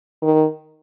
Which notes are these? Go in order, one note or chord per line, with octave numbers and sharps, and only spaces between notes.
D#3